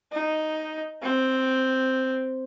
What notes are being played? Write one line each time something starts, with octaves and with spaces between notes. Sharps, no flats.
D#4
C4